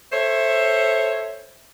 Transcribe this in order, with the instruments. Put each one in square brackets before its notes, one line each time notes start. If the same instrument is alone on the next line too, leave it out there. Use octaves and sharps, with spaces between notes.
[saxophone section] A4 C5 C#5 E5